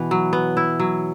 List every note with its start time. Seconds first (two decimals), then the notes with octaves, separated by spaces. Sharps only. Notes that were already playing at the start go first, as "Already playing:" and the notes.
Already playing: B2 E3 B3
0.11 F#3
0.33 B3
0.57 E4
0.80 F#3